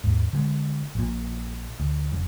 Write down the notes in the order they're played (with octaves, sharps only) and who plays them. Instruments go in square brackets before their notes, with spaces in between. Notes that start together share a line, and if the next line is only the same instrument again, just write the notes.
[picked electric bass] D#2 G#2
D3 F#3 G#3
A#1 A#2
D2
F1 F#2